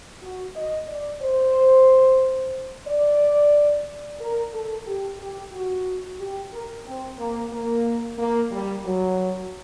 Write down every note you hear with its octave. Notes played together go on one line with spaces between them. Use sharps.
F#4
D#5
D5
C5
D5
A#4
A4
G4
G4
F#4
G4
A#4
C4
A#3
A#3
A#3
G3
F#3